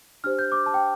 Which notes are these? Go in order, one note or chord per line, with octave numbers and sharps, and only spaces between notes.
D4 G4 C5 F6
G6
D6
A5
G5